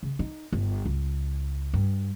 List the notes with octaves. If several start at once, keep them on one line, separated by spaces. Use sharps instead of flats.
C#3
D#4
G1
C#2
G2